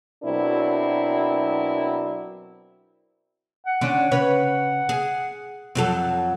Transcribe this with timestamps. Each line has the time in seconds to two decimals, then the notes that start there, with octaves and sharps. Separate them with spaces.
0.24 B2 F#3 C4 D4 E4 A#4
3.66 F#5
3.81 D3 C#4 D4
4.12 C#3 B4 C#5
4.89 G#4
5.75 F2 F#3 A4